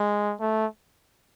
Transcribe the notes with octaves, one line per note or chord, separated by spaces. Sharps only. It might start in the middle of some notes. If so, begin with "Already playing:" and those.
Already playing: G#3
A3